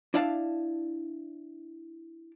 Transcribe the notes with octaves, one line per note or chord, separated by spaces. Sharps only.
D4 E4 D5 F5 A5